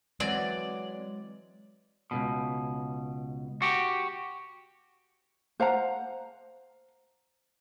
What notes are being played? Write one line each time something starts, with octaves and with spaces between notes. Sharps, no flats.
E3 F#3 G#3 C4 D5
C#2 F#2 B2
F#4 G4
C5 F5 F#5 A#5